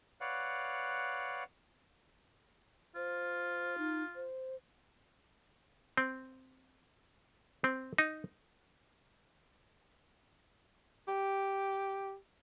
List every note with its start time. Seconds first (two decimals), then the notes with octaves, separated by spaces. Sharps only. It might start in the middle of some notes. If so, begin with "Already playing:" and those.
0.21 B4 C#5 D5 F5 F#5
2.96 F4 C5
3.78 D#4
4.15 C5
5.97 C4
7.64 C4
7.98 D#4
11.08 G4